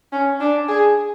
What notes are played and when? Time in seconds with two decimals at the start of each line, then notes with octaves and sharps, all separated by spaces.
0.12 C#4
0.41 D4
0.68 G#4